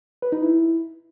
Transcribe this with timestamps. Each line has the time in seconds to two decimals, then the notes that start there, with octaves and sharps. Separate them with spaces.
0.22 B4
0.32 D#4
0.42 E4